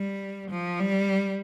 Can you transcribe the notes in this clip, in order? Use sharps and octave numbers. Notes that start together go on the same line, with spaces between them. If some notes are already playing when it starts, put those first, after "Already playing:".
Already playing: G3
F3
G3